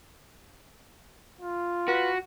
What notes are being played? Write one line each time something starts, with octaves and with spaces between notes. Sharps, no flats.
F4
F#4 B4